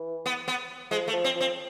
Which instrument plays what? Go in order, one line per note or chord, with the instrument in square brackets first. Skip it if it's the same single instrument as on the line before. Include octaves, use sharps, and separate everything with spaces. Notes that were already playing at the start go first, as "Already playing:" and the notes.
Already playing: [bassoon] E3
[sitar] B3
B3
[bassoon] F3 [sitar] G#3
[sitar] A3
[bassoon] F3
[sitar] C4
[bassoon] F3
[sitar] C4